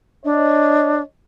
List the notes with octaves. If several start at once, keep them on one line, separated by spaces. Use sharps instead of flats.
D4 C#5 D#5